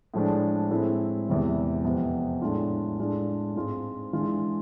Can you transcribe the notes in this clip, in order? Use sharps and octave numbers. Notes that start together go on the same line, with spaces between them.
A2 F3 G#3 D4
A2 G#3 C4 E4
E2 C3 E3 G#3
F2 C3 F3 B3
A2 G#3 D4 F4
A2 G#3 D4 F4
G#2 G#3 C4 F4
E3 G#3 D4 F4